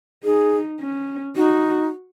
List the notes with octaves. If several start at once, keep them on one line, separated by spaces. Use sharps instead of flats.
D#4 G#4
C#4
D#4 F#4